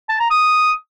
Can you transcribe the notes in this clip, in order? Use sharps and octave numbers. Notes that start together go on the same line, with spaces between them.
A5
A#5
D#6